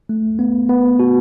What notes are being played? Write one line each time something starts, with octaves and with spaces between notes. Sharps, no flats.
A3
B3
B3
F#4